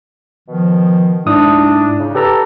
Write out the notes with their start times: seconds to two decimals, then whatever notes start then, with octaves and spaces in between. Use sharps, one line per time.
0.49 B2 D#3 F3
1.26 G#2 D4 E4 D#6
1.98 C#3 D#4
2.15 G4 A4 B4 A#5